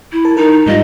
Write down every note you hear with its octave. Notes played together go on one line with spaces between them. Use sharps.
E4
A#4 A5
D#4 A#4
G#2 G3 F4 D#5